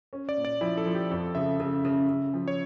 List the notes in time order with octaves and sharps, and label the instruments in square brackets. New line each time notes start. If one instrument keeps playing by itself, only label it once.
[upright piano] C#4
[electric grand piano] D5
[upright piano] A#2
[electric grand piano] D5
[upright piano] F3 [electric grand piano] E4
[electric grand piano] A4
[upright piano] F3
[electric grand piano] G4
[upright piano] F2 [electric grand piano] A4
[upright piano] C#3 [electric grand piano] E5
[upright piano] C#3
C#3
C#3
F3
[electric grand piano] C#5